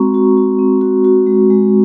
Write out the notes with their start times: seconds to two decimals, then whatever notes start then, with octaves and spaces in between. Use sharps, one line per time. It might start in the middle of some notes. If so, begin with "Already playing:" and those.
Already playing: G#3 C4 F#4 A#5 C#6
0.14 F#4
0.37 F#4
0.59 C4
0.81 F#4
1.04 F#4
1.26 G#3
1.50 G#3